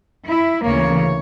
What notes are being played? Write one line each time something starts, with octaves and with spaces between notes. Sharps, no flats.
E4
D2 C#3 E3 A#3 C#5